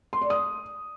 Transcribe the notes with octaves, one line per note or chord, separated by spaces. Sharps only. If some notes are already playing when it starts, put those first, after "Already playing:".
C6
D5
D#6